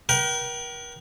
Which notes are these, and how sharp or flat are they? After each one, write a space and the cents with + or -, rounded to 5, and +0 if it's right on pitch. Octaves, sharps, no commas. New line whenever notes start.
A#4 +40 G5 -30